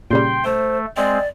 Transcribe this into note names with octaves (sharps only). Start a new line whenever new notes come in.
A#2 C#3 G3 G5 C6
A3 C5
G#3 C4 D5